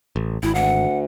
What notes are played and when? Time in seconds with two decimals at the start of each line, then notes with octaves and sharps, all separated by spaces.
0.16 A1
0.43 G#1 D2 E4
0.55 F#5